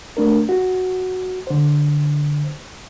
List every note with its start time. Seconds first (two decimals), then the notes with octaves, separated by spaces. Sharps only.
0.17 A3 D4 A#4
0.49 F#4
1.47 D3 C5